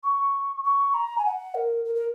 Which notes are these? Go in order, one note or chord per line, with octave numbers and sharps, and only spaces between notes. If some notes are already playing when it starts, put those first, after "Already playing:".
C#6
C#6
A#5
G#5
F#5
A#4
A#4
A#4